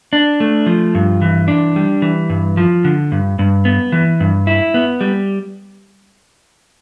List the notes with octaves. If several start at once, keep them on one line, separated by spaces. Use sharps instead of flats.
D4
A3
F3
G2
E3
D4
G3
E3
G2
F3
D3
G2
G2
B3
E3
G2
E4
B3
G3